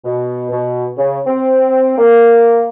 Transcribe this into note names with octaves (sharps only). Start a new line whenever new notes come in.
B2
B2
C#3
C4
A#3